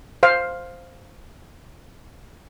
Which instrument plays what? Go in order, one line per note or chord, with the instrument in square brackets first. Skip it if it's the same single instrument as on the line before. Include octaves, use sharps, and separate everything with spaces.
[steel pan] C5 F5